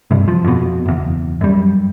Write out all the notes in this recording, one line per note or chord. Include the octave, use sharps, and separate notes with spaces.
G2 C3
F3
F2 B2
F#1 E2
F#2 G3